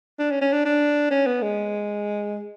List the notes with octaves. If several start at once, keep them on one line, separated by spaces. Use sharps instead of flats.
D4
C#4
C#4
D4
D4
C#4
B3
G#3